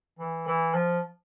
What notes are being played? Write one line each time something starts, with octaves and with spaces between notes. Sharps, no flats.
E3
E3
F3